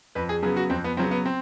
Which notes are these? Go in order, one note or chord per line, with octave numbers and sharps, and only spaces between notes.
F2 B4
G#4
C#3 F#3 B3 G#4
F#4
F2 C4
B3
C#3 F#3 B3 C4
B3
C4